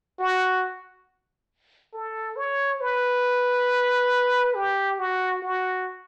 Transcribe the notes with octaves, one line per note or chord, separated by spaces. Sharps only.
F#4
A4
C#5
B4
G4
F#4
F#4